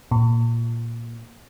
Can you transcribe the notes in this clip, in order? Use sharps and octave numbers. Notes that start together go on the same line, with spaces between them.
A#2